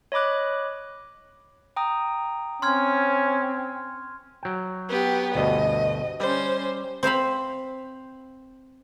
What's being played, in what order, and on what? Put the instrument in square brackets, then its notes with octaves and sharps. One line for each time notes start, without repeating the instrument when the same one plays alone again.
[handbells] C#5 D#5 B5 D6 F#6
G5 A#5 D#6
[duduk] C4 [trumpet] C#4 [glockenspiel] C6 F6 G#6
[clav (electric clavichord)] F#3 G5
[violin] B3 G4
[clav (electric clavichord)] D2 G2 B2 [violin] D#5
[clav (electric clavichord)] G3 [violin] C#4 C5
[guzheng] C4 C5 F5 B5